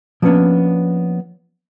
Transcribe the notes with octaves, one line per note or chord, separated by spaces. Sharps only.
F3 G3 A#3 B3 C#4 D4